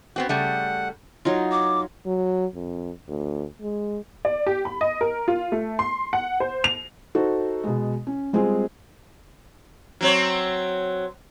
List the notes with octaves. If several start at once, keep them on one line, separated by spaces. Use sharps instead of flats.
B3 C4 F#4
C#3 G3 A3 F#5
F#3 D#4 F4
D6
F#3
F2
D2
G#3
D5
G4
B5
D#5
A#4
F4
A3
C6
F#5
C5
F7
D#4 F#4 A4 C5
B2 G#3
C#4
G3 G#3 C4 F4 G#4
F#3 C4 C#5